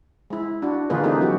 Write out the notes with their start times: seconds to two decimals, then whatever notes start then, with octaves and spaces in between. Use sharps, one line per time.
0.30 G#3 E4
0.62 D4 F#4
0.90 D3 E3 A#3 F4 G#4 B4
1.04 A3 A#3 C4 D#4 E4 G4
1.21 F#3 F#4 G4